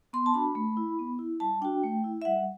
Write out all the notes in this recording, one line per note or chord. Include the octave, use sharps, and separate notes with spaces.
B3 C6
A5
D4 F#4 B5
A3
E4
B3
E4
G3 A5
D4 F#4 G5
A3
E4
E5
G3 F#5